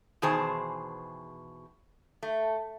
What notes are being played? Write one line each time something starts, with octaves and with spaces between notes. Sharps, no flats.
E2 B2 D#3 G#4 C5 A5
A3